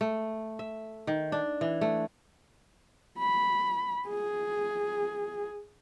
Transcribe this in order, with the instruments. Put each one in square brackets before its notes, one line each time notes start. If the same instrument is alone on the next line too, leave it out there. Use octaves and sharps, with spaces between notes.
[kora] A3
E5
D#3
D4
E3
A3
[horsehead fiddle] B5
G#4